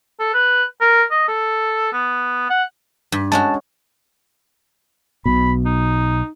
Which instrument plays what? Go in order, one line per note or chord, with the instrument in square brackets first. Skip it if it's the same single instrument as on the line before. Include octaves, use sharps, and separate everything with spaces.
[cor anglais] A4
B4
A#4
D#5
A4
B3
F#5
[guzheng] G2
[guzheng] G#3 C#4 F#4 [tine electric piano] A5
[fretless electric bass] B1 B2 [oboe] B5
[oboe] D#4